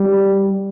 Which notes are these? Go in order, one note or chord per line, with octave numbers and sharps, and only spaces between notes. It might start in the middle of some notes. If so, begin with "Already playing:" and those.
Already playing: G3